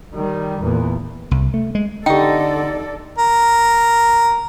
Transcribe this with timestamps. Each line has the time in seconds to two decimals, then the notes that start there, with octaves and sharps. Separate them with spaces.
0.14 D#3 G3
0.60 E2 A#2
1.31 C2
1.54 A3
1.75 G#3
2.06 D3 D#4 G4 A4 D5 G5
3.18 A#4